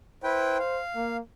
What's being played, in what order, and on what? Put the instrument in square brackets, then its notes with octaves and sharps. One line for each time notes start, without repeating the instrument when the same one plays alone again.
[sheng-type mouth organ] E4 B4 G5 [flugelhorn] C5
[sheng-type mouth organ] F5
[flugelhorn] A#3